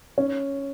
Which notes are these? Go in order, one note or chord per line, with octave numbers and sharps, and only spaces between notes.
C#4